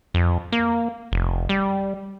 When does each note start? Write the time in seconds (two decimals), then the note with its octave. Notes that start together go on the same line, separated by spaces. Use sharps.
0.14 F2
0.52 A#3
1.12 F1
1.49 G3